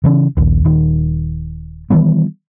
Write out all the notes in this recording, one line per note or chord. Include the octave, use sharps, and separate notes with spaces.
C#3 E3 C#4
A#1 D#2
D#1 D#3
D#3 E3 G3 B3